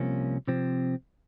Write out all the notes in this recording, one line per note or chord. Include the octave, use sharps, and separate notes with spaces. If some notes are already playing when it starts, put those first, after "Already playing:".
Already playing: C2 C3 F3 A#3 C#4
C3 F3 C4